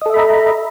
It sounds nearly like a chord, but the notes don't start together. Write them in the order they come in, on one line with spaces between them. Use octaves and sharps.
D#5 A4 E5 B5 A#5